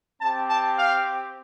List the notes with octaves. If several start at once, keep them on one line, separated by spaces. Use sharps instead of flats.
C4 G4 A5
A5
F5